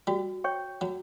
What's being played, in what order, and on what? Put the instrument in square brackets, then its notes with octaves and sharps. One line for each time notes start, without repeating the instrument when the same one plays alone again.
[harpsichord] G3 [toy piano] F#4
[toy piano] C#5 G5 C#6
[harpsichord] F#3 [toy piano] F#4